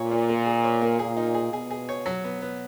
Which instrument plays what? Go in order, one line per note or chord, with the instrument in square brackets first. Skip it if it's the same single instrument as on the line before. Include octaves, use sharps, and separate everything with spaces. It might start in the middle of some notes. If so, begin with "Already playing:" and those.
Already playing: [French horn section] A#2 [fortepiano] C#5
[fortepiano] A#3
A#3
G#4
C#5
A#3
[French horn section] A#2 [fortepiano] G#4
[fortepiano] D#4
G#4
[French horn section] B2 [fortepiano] G#4
[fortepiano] G#4
C#5
F#3
B3
B3